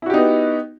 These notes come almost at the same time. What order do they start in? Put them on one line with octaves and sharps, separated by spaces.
E4 F#4 G4 D#4 B3